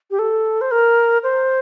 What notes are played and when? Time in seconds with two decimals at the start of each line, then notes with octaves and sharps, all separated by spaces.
0.11 G4
0.19 A4
0.61 C5
0.71 A#4
1.23 C5